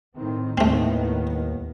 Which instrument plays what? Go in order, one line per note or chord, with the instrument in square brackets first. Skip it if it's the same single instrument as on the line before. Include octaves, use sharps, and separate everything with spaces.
[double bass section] A2 D#3 C4
[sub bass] D#2 [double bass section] A2 D#3 B3 [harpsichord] A3 C4